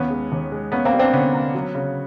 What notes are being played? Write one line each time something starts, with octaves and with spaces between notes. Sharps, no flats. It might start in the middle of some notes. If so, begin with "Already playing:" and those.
Already playing: D#2 B3 C#4
G#3
D#2
G#3
A#3 B3 C#4
A#3 C4
G3
C4 D4
D3 B3 C#4
A#3
F#3
C#3